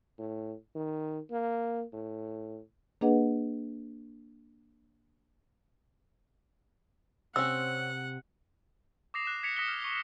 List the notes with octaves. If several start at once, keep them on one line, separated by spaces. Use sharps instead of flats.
A2
D#3
A#3
A2
A#3 D4 G#4 B4 D#5 F#5
C3 C4 C#4 F#5 E6
D6 D#6 A#6 C7 F7
F#6 E7
G#6 B6 C#7 F7
D#6 A#6 B6 C#7 E7 G7
F6
C#6